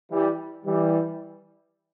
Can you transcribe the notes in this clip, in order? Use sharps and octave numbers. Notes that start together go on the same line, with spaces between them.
E3 G3
E3 G3